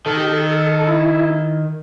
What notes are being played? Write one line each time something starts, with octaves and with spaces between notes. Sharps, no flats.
D#3 A4
G4
A4
A4
E4